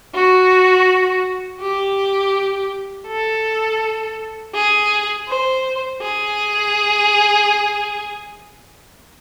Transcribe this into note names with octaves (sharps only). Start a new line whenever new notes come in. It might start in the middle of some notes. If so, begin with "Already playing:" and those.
F#4
G4
A4
G#4
C5
G#4